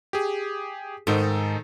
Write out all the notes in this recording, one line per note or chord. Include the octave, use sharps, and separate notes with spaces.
G4 G#4
G#2 D#3 D#4 A4